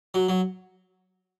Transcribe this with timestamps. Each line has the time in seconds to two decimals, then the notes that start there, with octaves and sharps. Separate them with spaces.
0.14 F#3
0.29 F#3